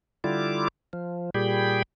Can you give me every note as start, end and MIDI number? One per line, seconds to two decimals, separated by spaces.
0.24 0.68 50
0.24 0.68 55
0.24 0.68 64
0.24 0.68 65
0.24 0.68 86
0.93 1.30 53
1.34 1.82 46
1.34 1.82 55
1.34 1.82 67
1.34 1.82 68
1.34 1.82 79
1.34 1.82 83